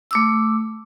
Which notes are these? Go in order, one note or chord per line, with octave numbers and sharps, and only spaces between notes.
A3 D6 E6